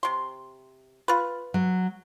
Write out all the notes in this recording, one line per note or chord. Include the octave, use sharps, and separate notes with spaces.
C3 C6
F4 B4
F#3